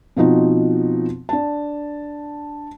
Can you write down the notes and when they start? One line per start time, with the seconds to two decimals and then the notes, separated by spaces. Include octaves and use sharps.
0.17 B2 F3 C4 D#4 F#4
1.29 D4 A5